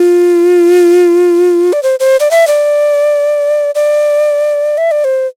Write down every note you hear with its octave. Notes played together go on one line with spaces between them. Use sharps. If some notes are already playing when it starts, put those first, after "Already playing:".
Already playing: F4
D5
C5
C5
D5
E5
D5
D5
E5
D5
C5